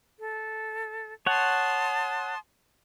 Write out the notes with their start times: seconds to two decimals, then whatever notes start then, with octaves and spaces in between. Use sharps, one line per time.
0.19 A4
1.26 C#5 F#5 A5 C6 D#6